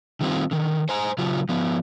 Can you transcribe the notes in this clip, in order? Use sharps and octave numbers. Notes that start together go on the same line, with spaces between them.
D#3 G3 C4 F4
D3 D#3
C5 G#5 A#5
C#3 F#3 F4
F3 B3